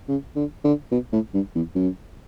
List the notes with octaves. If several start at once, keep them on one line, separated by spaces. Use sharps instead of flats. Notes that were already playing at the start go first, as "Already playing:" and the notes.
C#3
D3
D3
B2
A2
G2
E2
F#2